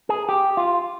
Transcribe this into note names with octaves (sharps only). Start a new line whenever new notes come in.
G#4
G4
F4